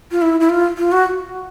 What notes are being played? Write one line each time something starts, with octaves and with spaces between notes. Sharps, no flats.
F4
E4
E4
F4
F4
F#4